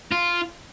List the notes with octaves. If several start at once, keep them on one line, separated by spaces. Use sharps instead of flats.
F4